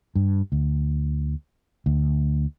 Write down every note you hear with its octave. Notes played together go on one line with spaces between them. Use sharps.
G2
D2
D2